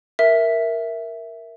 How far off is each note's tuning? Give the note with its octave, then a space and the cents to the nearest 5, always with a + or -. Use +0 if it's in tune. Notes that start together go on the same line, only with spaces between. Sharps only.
A#4 +0 E5 +0